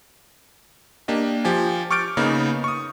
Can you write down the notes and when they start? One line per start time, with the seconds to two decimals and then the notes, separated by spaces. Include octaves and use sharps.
1.08 A#3 D4 G4 D#5
1.45 F3 G4 G#5
1.91 C#6 D6 F6 G6 A6 D7
2.17 C#3 A#3 B3 D#4
2.64 C#6 D#6